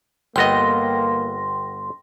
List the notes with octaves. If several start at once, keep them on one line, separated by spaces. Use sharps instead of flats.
G1 A#3 B3 D#5 G5 C6 A#6